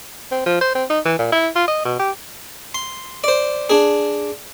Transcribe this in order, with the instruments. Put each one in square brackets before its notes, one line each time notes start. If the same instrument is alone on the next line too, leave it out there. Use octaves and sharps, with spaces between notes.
[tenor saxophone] C4
F3
C5
C4
D#4
E3
A#2
E4
F4
D#5
B2
G4
[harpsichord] C6
C5 D5
D4 G#4